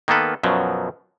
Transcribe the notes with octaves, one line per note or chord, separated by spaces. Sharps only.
D#3 A#3 B3 A4 B4
F#2 B2 F3 F#3